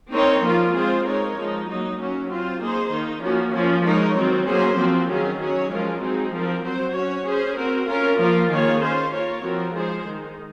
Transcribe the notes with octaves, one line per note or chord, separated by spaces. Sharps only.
C4 D#4 A#4 C#5
F3 A#3 F4 A#4
G#3 C4 F4 G#4 C5
G#3 D#4 A#4 C#5
F3 G#3 D#4
F#3 A#3 D#4
F#3 A#3 C#4
C4 F4 C5
A#3 D#4 G#4 C5
D#3 A#3 D#4
F3 A#3 C#4 F#4
F3 A#3 C#4
G#3 D#4 A#4 C#5
D#3 F#3 C4 F#4
F#3 A#3 C#4 G#4 C5
F3 C4 F#4
D#3 F#3 C#4 F4 G#4
F#3 C#4 G#4 C#5
F3 G#3 C#4 F4 A#4
F#3 C4 D#4 G#4
F3 C4 F4 A#4
F#3 C4 F#4 C5
C#4 F#4 C#5
C#4 G#4 C5
C4 F#4 A#4
C#4 F4 A#4
F3 A#3 F4 A#4
D#3 A#3 F4 G#4 C#5
C#4 F4 C5
A#3 F4 A#4 C#5
F3 C4 F#4 A#4
F3 G#3 D#4 G#4 C5
D#3 G#3 D#4